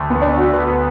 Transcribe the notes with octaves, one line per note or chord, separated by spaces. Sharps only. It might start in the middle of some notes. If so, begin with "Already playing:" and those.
Already playing: D2 D3 A3
B3
D4
F#4
D2 D3 B3 B4
B4